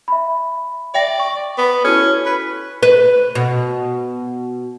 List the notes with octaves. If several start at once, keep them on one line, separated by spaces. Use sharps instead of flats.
E5 B5
D5 E5 G5 A#6
C#6
B3
C#4 E4 F#4 A4
B4
B4
B2